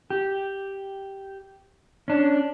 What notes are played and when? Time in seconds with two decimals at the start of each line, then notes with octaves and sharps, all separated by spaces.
0.10 G4
2.08 C#4 D4